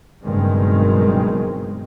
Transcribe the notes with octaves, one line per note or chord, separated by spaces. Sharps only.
F#1 G2 B2 D#3 G#3 C4